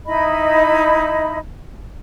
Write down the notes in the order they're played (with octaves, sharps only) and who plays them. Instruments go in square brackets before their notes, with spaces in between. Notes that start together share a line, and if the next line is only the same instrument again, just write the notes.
[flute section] D#4 E4 D#5 B5